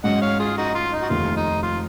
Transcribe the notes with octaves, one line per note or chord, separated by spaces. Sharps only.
G#2 F#3 C#4 D#5 F#5
C#5 F5
F4 G#4
D#4 F#4
F4
D#4
F#4
F1 D#2 D#3 F4
D#4
F4